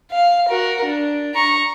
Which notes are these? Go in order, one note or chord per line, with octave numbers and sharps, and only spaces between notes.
F5
F#4 A#4
D4
A#5 C#6